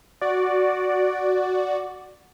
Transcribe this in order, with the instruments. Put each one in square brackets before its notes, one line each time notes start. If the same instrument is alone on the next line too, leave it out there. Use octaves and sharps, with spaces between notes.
[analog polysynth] F#4 D5